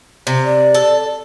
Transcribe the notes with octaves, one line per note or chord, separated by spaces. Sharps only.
C3
D5
A4